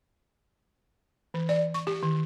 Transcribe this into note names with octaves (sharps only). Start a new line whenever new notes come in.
E3
D5
C#6
G4
D#3